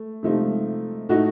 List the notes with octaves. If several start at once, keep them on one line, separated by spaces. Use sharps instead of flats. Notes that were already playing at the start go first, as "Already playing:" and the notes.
Already playing: A3
C3 F3 A3 D#4
A2 A3 D#4 F#4